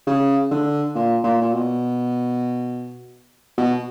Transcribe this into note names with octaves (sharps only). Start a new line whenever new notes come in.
C#3
D3
A#2
A#2
A#2
B2
B2